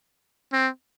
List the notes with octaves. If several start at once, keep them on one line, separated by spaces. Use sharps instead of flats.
C4